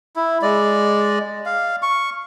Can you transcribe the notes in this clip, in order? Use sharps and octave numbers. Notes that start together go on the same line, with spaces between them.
E4
G#3 D5
F5
C#6